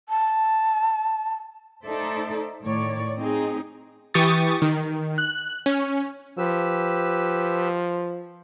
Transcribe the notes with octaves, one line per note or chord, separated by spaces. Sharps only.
A5
A3 D#4 A4 C5 D5 E5
A2 D#3 C#5 D5
C4 D#4 G#4
E3 G4 C#6 D#6 A6
D#3
F#6
C#4
F3 G4 B4 E6